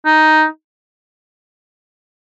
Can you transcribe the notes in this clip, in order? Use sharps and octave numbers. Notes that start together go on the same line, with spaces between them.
D#4